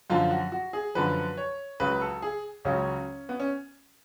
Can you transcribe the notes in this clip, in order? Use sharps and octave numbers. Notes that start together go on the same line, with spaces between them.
F#2 D3 F3 F4
F#4
F#4
G#4
F#2 D3 F3 B4
C#5
C#2 C#3 F#3 B4
A4
G#4
C#2 C#3 F#3 C#4
B3
C#4